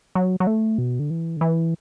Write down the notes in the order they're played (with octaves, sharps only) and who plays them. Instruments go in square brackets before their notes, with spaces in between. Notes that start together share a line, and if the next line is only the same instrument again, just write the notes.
[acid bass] F#3
F#3
A3
B2
D3
E3
D3
E3